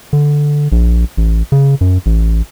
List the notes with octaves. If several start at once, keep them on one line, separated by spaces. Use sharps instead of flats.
D3
A#1
A1
C#3
F#2
A1